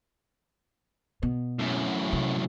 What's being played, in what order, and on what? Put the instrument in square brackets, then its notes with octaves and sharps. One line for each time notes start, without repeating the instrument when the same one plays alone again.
[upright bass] B2
[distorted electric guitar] F#2 A2
[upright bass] C3